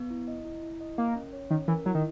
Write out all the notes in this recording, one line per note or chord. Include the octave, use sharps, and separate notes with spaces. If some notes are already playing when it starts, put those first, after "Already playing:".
Already playing: B3
E4
D#5
E4
E4
D#5
A#3 A#4
C#4
C#5
D#3 C#4
E3 A#4
F#3 E4
D#3